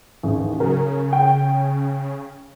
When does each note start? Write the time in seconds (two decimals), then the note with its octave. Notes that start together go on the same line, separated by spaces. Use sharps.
0.23 A1 D#2
0.60 C#3 F#3 A#4
1.13 G5